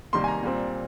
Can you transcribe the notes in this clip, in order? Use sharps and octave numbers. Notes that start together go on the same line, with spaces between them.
C3 D#3 G3 A#3 C6
G#5
A#5
A#2 G3 C4